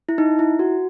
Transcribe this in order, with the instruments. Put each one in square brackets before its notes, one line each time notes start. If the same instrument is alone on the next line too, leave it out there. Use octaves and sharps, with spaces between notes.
[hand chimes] E4
D#4
E4
F#4